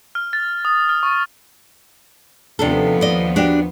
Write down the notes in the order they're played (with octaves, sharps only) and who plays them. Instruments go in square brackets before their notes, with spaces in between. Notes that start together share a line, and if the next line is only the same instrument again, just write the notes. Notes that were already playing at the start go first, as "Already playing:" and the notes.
[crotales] F6
A6
D#6
F6
C#6
[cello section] D#2 F3 B3 [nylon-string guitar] C3 D4 A4
[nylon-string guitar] D5 D#5
D4 F#4 G4